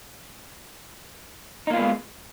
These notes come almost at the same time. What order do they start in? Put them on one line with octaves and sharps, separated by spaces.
D#4 A#3 F4 B3 G#3